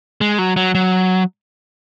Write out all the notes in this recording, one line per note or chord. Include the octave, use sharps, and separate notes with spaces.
G#3
F#3
F#3
F#3